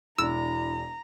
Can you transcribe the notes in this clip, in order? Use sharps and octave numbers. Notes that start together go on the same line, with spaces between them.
E1 D4 E4 A#5 E6